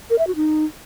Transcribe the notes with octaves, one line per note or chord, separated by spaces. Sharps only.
A#4
E5
F#4
D#4